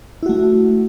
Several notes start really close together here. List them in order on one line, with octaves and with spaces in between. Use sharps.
E4 F#4 A3